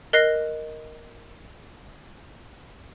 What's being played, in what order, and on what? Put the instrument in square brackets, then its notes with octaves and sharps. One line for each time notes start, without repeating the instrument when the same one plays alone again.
[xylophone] A#4 D#5 F#6 A#6 C7